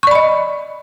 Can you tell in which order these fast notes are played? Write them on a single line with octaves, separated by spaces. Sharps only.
C#6 D5 B5 D#5